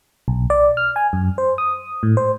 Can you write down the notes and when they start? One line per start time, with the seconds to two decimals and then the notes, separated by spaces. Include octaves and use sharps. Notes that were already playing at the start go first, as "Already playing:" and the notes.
0.28 B1
0.50 D5
0.77 F6
0.96 G#5
1.13 F#2
1.38 C5
1.58 D#6
2.03 A2
2.17 C5